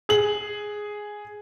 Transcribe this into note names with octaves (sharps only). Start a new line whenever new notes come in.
G#4 F#7